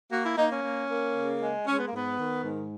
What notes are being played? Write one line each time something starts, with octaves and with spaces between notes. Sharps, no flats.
A#3 F#4
E4
A#3 D#4
C#4
A#3
A#3
C#3
G#3
G#3 C#4
B3
A#3
G#2 B3
D#3
G#2